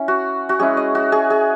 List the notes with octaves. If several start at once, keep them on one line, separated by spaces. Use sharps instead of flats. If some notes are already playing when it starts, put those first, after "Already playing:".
Already playing: C#4 E4
F#4
F#4
G#3 C#4 E4 G#4
D#5
F#4
G#4
G#4